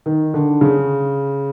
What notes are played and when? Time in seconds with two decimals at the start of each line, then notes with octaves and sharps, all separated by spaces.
0.06 D#3
0.34 D3
0.61 C#3